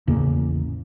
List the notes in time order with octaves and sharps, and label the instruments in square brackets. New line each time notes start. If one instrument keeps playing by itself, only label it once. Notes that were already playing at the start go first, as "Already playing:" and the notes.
[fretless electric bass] A1 E2 C#3 A#3